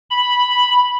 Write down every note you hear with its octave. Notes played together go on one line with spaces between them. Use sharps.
B5